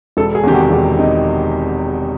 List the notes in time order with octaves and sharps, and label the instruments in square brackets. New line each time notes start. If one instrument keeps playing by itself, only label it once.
[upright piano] E1 A4
G#4
E2 C3 D#3 G4
F#4
E1
C3 D#4